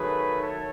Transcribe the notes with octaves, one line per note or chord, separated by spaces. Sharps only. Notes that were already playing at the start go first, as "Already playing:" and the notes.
Already playing: D#3 F#3 A3 G#4 B4
A4 C#5